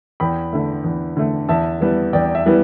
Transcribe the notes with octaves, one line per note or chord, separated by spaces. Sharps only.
E2 G5 B5
D3 A3
E2
D3 A3
E2 E5 A5
E3 G3 B3
E2 D5 G5
E5
E3 G3 B3